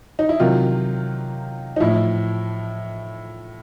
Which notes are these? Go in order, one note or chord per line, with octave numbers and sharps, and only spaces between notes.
D#4
E4
C3 D#3 F#3 F4
D#4
A2 F3 E4